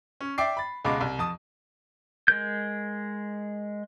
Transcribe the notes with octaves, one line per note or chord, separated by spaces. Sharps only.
C#4
D5 E5 G5 D6 C7
B5 A6
C#2 B2 G#3 B5 D6
C2
F2 A5 D#6
G#3 A#4 G6